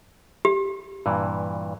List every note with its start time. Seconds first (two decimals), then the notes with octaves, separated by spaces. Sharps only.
0.45 G4
1.06 G2 A#2 E3